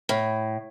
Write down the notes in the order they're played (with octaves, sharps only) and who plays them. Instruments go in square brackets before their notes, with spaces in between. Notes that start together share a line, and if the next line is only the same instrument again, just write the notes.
[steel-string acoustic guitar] A2